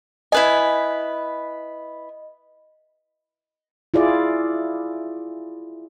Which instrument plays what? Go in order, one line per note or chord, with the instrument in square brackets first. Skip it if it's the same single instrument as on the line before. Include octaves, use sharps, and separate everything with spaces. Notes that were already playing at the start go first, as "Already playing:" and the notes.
[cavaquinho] E4 B4 G#5 [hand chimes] D#5
[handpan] E4 F4 G#4 D5